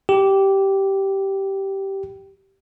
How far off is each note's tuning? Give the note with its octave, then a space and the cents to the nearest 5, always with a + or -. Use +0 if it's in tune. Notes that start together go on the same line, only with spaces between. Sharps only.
G4 -10